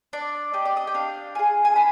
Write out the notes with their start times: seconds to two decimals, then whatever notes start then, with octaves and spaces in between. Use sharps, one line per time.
0.13 D4 D5
0.54 G4 D#5
0.65 D5
0.77 D#5
0.87 G5
0.94 D4 F5
1.35 F4 G#4 G#5
1.65 G#5
1.75 D4 B5